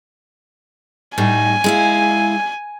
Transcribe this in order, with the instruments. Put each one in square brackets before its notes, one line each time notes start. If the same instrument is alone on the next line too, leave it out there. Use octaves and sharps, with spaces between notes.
[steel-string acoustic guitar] A2 G3 D#4 [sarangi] G#5
[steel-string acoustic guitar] G#3 E4 F5